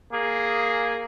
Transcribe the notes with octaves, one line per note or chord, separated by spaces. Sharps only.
A#3 G#4